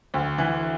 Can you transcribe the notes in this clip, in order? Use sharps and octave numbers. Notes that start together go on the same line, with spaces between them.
D2
E3